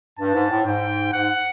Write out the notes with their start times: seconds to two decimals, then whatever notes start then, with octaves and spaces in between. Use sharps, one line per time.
0.18 G2 A5
0.34 G#2
0.50 A2
0.65 G#2 G5
1.13 G#2 F#5